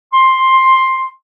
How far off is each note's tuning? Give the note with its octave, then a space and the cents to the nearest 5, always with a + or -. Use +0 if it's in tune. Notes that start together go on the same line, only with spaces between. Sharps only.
C6 +10